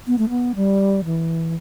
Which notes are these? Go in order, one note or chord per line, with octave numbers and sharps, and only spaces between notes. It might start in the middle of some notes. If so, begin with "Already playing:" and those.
B3
A3
B3
G3
E3